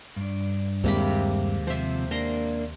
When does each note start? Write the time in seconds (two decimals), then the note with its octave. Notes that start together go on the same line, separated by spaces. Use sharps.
0.16 G2 D4
0.84 D#2 C3 G#3 A#3 B5
1.67 C3 F3 C5 E5
2.11 A#3 D4 A#5 C6